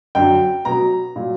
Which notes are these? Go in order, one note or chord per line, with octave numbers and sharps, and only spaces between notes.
F#2 D3 F#3 G5
B2 F#3 A#5
A#2 F#3